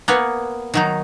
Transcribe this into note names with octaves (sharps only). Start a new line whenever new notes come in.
A#3 B3 B4 C#5
D#3 F#3 D#4